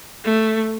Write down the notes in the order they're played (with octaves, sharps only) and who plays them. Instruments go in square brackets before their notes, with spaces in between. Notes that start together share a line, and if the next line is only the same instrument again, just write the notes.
[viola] A3